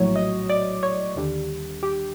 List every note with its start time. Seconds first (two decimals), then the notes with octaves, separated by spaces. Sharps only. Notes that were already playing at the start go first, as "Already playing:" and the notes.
Already playing: A#1 A2 F#3 C#5
0.16 D#5
0.49 D5
0.83 C#5
1.16 D#2 D3 G3
1.83 G4